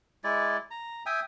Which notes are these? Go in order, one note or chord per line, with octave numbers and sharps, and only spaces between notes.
G#3 E4 D5
A#5
E5 G5 G#5 D#6